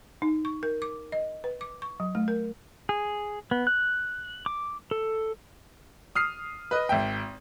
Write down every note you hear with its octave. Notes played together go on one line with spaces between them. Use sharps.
D#4
C#6
A#4
D6
D#5
B4
D6
C#6
F#3
A3
A#4
G#4
B3
F#6
D6
A4
D#6 F6 C7
B4 D#5
G#1 E5 G5